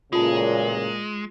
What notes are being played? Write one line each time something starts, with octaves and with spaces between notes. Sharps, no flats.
A1 F#2 A#2 C#3 G#3 F4 A5